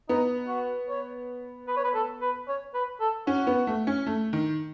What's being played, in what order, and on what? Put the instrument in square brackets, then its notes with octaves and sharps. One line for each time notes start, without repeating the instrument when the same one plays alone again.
[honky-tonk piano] B3 [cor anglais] D#4
[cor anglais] F#4
C#5
B4
C#5
B4
A4
B4
C#5
B4
A4
[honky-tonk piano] C#4 [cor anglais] F#4
[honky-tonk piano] B3
A3
C#4
A3
D#3